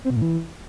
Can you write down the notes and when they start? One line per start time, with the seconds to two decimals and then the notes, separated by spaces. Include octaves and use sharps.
0.05 C4
0.10 B2
0.16 A2
0.22 E3